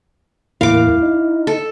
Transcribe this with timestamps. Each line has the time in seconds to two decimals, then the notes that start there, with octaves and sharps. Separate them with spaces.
0.61 E2 A2 A#3 E4 F5 D6
1.02 D#4
1.47 A4